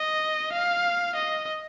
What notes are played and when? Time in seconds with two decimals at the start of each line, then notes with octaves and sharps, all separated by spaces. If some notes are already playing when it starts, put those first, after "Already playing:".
Already playing: D#5
0.52 F5
1.15 D#5